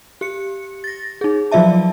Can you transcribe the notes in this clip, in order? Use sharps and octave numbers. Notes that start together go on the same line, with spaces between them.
G4 C#7
A6 A#6
D#4 G#4
F3 F#3 F4 D5 E5 A5